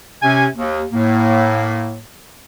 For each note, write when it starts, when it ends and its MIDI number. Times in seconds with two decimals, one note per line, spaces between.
0.22 0.46 48
0.22 0.46 61
0.22 0.46 80
0.56 0.83 39
0.92 1.98 45
0.92 1.98 58